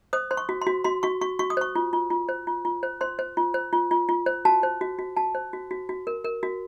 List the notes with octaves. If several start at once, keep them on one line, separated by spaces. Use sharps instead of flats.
C5 D#6
C5 C6
C#6
F#4
C6
F#4
F#4 C6
F#4 C#6
F#4 C#6
F#4 C#6
D#6
C5 C#6
F4
F4
F4
C5
F4
F4
C5
C5 C6
C5
F4
C5
F4
F4
F4
C5
F#4 A5
C5
F#4
F#4
F#4 A5
C5
F#4
F#4
F#4
A#4
A#4
F#4